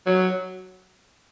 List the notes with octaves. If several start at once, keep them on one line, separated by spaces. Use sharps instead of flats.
F#3